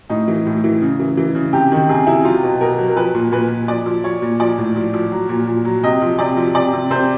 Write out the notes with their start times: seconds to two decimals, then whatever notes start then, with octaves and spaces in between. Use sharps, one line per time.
0.09 A2 D#4
0.28 E3
0.46 A2
0.64 E3
0.82 C#3
1.00 E3
1.17 E3
1.35 C#3
1.53 C3 G4
1.72 D#3
1.89 C3 G#4
2.07 C3 E4
2.25 F#3 F4
2.43 B2
2.61 B2 A#4
2.78 F#3
2.89 A#4
2.96 F3 B4
3.14 A#2
3.32 A#2 B4
3.51 A#2
3.68 F3 D5
3.86 F3
4.04 F3 C#5
4.22 A#2
4.40 F3 D5
4.58 A2
4.76 F3
4.94 F3
5.12 F#3
5.29 A#2
5.47 A#2
5.65 F#3
5.83 C3 D#5
6.01 F3
6.19 C3 D5
6.37 F3
6.55 C3 D5
6.73 C3
6.90 C3 C5